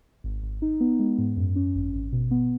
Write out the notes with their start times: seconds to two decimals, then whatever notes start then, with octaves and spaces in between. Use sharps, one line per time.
0.24 G#1
0.43 G#1
0.62 D#4
0.80 B3
0.99 G#3
1.18 G#2
1.37 F#2
1.56 C#4
1.75 G#1
1.94 G#1
2.12 B2
2.31 B3